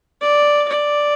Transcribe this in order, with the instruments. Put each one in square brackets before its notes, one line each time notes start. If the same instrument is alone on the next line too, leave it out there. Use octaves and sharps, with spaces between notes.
[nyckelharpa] D5
D5